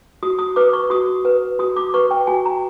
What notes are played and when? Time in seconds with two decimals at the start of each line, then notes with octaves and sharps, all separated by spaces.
0.23 F#4 D#6
0.39 D#6
0.56 B4 D6
0.73 C#6
0.90 F#4 D#6
1.25 B4
1.59 F#4 D#6
1.76 D6
1.94 B4 C#6
2.11 G5
2.27 F#4 G#5
2.45 A#5